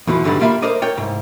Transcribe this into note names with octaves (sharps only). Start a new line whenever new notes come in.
E2 B2 E3 F3
G2 B2 D3 D#3 F#3 G3
G3 A#3 F4 E5 B5
A#4 C5 D5 D#5
A#4 C#5 D5 G5
C2 G#2